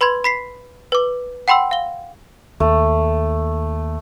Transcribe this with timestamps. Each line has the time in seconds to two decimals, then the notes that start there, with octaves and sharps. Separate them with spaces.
0.01 B4 B5 C6 G#6
0.24 B5 B6 C7
0.92 B4 D6
1.48 F#5 G5 B5 C6 E6
1.71 F5 G7
2.60 D#2 A3